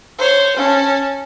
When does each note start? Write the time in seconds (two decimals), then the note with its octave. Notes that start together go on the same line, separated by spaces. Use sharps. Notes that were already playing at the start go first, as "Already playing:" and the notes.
0.19 C5 C#5
0.57 C#4 A5